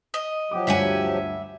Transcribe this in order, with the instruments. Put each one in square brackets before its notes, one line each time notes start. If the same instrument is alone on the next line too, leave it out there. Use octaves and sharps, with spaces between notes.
[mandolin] D#5
[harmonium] F3 F#3 G4 [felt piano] F#5 D6
[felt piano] D2 G2 [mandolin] E5 F#5 G#5